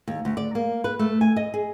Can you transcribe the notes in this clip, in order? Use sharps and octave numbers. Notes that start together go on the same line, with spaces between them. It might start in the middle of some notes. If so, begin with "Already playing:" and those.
D#2
D2
D5
A#3
B4
A3
G#5
D#5
G#4